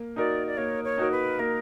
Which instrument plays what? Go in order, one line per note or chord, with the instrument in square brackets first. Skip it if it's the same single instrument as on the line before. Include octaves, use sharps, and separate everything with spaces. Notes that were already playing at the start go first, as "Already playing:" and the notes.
Already playing: [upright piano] A#3
[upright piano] D#4 F#4 A#4 [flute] D5
[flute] D5
[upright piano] A#3 [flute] C#5
[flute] C#5
[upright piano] D#4 F#4 A#4
[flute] B4
[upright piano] A#3 [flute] A#4